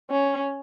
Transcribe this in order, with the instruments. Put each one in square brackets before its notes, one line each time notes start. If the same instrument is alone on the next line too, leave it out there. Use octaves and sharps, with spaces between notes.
[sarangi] C#4